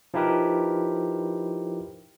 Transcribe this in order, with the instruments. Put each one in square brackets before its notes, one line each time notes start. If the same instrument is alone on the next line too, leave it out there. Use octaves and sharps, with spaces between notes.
[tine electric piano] F3 D#4 E4 G4 A#4 B4